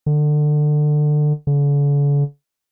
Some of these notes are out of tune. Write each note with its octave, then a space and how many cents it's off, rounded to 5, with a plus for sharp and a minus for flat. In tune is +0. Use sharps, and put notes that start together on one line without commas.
D3 +25
D3 -45